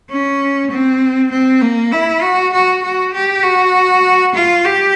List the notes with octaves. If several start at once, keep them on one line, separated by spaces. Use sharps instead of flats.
C#4
C4
C4
A#3
E4
F#4
F#4
F#4
G4
F#4
F4
G4